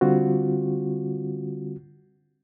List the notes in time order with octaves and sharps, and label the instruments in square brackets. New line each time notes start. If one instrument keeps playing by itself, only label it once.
[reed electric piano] D3 G3 C4 F4 F#4